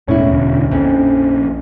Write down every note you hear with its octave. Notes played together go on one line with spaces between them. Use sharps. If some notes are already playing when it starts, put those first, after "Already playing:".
E1 A2 C#4 E4
E1 D2
A#1 F2 C#4